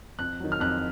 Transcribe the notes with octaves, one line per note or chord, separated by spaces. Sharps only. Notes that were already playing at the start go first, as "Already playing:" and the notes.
F2 F#6
D#3 F#3
F6
F2 F#6